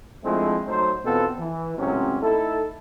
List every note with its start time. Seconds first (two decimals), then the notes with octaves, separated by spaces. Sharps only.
0.24 F3 G#3 A3 C4 D4 E4
0.67 F#3 A3 D#4 C5
1.05 E2 B2 B3 C4 F4 A4
1.38 E3
1.78 C#2 A2 C3 F#3 C4 C#4
2.22 A3 D#4 E4 A4